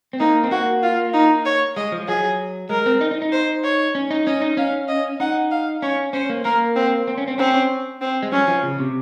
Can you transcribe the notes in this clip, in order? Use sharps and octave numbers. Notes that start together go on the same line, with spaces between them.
C4
A#3 D#4
C4
A#3 F#4
F4
D#4
C#5
G#3 D#5
F3
F#3 G#4
G#3 A#4
C4
D#4
D#4
D#4
C5
C#5
C#4
D#4
C#4 D#5
D#4
C#4 F5
D#5
D#4 F#5
F5
C#4 C#5
C#4 C5
A#3
A#3 A#4
C4
C4
C#4
C4
C4 C#4
C#4
C4
G#3
F#3 C#4
F3
C#3
C3